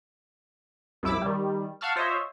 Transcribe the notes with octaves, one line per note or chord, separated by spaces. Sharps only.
C2 F#2 E4 D6 E6
D#3 G3
F5 F#5 A5 C#6 E6 F6
F4 C5 C#5 D#5 E5